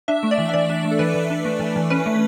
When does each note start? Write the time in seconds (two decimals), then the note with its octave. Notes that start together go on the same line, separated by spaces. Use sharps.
0.08 D4 E5
0.23 A3
0.31 D5
0.38 E3
0.49 E5
0.54 E3 D5
0.70 D4
0.84 A3
0.91 A4
0.99 E3 B4
1.14 E3
1.30 D4
1.45 A3
1.60 E3
1.76 E3
1.90 C#4 B4
2.06 A3